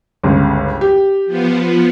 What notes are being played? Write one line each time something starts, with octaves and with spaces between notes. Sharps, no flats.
G1 C#2
G4
F3 B3